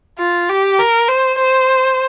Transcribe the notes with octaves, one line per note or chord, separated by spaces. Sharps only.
F4
G4
A#4
C5
C5